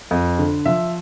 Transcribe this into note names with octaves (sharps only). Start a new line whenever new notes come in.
F2
D3
F3 E5